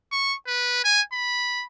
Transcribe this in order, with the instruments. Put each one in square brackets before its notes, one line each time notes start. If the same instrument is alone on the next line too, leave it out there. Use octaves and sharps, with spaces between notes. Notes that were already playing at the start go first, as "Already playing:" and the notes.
[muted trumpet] C#6
B4
G#5
B5